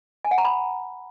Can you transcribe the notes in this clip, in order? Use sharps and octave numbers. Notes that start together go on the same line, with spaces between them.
G#5
F#5
A#5
B5